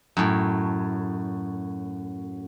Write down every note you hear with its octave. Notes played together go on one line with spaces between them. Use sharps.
F#2 A2